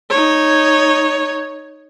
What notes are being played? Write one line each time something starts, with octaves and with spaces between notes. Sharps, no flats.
D#4 C#5